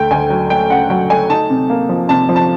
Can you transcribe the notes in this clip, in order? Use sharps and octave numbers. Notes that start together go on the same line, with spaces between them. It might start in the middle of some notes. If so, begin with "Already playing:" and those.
Already playing: D2 A3 G5
D2 G#5
F#3
A3 G5
C#3 F#5
F#3 G5
A3 G#5
D#4 A5
C3
A#3
F3
C3 A5
F3
A5